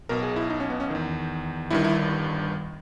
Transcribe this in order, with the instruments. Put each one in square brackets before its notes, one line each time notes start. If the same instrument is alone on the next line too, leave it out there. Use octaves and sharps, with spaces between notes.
[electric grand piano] B1 B2 A#4
G#4
E4
D#4
C#4
B3
C#4
E2 D#3
G1 G2 D#3 E4
E4